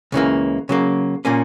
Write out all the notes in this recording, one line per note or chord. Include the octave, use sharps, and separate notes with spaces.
C#2 C#3 E3 A#3
C#3 F#3 A#3
A#2 A#3 C#4